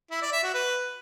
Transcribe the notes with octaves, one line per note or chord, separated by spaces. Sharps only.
E4
D5
E5
F#4
B4